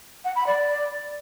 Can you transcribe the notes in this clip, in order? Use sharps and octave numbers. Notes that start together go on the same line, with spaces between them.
F#5
B5
D5